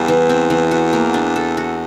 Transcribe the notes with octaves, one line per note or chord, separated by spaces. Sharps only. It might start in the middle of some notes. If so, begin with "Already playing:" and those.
Already playing: E2 G3
E3
C4
E3
F#4
A#3
D4
A4
F#4